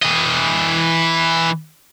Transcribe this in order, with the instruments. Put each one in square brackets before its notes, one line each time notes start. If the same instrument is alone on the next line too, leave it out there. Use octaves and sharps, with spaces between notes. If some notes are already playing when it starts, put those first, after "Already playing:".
[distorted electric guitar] E3 D#5